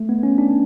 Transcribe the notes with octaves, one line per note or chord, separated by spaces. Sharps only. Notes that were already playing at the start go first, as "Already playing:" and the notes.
Already playing: A3
B3
C#4
D4